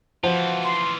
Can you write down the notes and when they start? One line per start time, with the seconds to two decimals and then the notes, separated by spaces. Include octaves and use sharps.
0.24 E3 F3 F4 F#4
0.64 C6